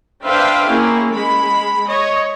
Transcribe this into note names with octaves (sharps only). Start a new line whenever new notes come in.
D4 B4 C5 E5 F5 G5
A#3 C#4 E4 G#4
G#3 B5
C#5 D#5